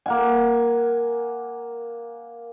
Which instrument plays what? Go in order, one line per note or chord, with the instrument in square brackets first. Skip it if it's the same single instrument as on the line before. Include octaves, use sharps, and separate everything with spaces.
[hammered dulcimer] A#3 F#5 G#5